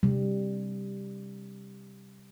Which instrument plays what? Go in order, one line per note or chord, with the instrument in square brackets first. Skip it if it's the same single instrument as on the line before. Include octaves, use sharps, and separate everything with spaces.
[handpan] C3 G3